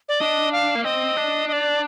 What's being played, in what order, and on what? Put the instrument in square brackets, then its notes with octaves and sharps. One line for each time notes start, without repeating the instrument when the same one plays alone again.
[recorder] D5
[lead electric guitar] D4 [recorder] D#5
[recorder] F5
[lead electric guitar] A#3
[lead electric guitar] C4 [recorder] D#5
[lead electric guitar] D4
[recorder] D#5
D5